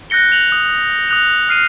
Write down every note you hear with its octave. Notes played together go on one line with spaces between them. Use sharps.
F#6 G6 A#6 C#7 G7
F7 F#7
D#6
D#6 F#6 F7
F6 C7 D#7